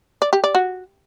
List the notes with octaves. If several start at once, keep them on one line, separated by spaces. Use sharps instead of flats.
D5
G4
D5
F#4